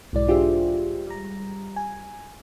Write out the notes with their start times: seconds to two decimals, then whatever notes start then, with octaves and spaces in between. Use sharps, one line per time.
0.13 B1 G#2 E3 G#3 D5
0.28 D4 F4 G4 G#4 C5 E5
1.07 G3 A#5
1.76 G#5